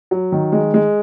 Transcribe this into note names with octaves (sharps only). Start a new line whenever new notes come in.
F#3
D#3
G#3
G#3